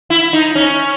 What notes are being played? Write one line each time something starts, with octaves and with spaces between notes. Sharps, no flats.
E4
D#4
C#4